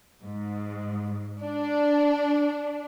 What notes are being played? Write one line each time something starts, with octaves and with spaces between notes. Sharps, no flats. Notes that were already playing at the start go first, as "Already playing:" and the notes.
G#2
D4